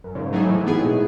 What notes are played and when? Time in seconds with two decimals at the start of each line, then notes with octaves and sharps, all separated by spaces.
0.04 F#2
0.15 G#2 C#3
0.26 G#2
0.33 A2 F#3 A3 D#4 G#4
0.49 E3
0.66 B3 E4 G#4
0.83 B2